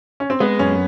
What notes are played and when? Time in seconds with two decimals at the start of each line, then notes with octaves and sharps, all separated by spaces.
0.20 C#4
0.30 C4
0.40 G#3 B3
0.59 F#2 C#4